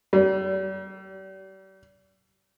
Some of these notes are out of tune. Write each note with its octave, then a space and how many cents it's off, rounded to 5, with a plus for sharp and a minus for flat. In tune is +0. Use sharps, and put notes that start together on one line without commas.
G3 -40